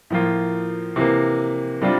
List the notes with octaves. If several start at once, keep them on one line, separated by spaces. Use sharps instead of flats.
A2 F3 A#3 F4
C3 E3 A#3
C3 G3 D4 F4